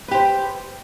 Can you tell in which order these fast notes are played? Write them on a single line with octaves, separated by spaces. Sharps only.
B4 G4 C5